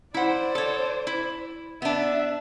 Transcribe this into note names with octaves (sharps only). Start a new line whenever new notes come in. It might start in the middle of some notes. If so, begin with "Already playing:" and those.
E4 C5 D5 F#5
A4 C#5
E4
B3 D4 E5